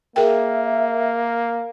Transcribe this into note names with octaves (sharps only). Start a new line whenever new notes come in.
A#3 G#4 A#4 E5 G5